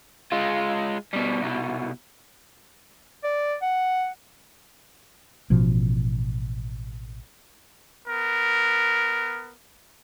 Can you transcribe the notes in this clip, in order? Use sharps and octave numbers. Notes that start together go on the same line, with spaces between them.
G#3 F4
B2 G3
C2 B2
D5
F#5
A1 B2 F3
B3 A#4